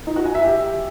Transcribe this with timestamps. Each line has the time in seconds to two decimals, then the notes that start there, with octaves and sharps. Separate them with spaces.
0.07 D#4
0.16 F#4
0.25 G#5
0.35 E5
0.44 G4